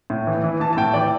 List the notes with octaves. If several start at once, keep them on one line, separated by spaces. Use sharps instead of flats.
A2
E3
E3
E3 A5
A5
A2 G5
E3 D5